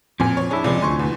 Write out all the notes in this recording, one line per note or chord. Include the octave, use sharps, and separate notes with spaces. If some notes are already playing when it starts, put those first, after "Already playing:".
F2 A#2 C4 G#5
C#5
D4 E4 G#4
C#2 C3 F3 D5 D6
D2 G#5 C6 C#6
E2